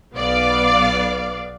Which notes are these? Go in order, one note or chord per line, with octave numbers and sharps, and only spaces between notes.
B1 B3 D5 F5